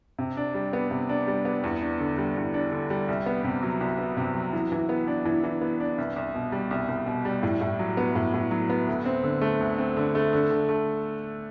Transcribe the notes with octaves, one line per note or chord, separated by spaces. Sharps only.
C3
D4
G3
B3
C3
D4
G3
B3
E2
D4
D3
G3
E2
D4
D3
G3
C2
B3
C3
F#3
C2
B3
C3
F#3
E3
E3
B3
D4
E3
E3
B3
D4
C2
C2
B2
G3
C2
C2
B2
G3
A2
A2
F#3
B3
A2
A2
F#3
B3
D2
C4
D3
A3
D2
C4
D3
A3
D3
D3
A3